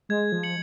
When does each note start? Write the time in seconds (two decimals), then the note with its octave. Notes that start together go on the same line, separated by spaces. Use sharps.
0.09 G#3 G#6
0.32 F3
0.43 C#7 F#7